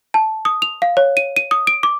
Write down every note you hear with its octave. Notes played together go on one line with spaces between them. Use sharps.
A5
D#6
F7
F5
C#5
D#7
D#7
D#6
D7
D6